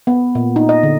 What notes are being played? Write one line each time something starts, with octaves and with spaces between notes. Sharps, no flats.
B3
A#2
D#4
D#5
D3